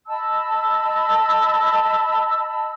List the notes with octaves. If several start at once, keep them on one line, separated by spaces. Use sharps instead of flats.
D#5 A5 B5 E6